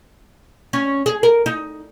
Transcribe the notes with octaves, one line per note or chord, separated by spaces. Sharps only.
C#4
G#4
A#4
D#4